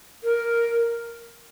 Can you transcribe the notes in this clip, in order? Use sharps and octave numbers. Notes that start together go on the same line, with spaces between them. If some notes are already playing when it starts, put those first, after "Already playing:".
A#4